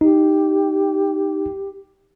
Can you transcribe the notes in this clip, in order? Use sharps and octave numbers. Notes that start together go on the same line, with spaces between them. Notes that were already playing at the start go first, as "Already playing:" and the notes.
D#4 G4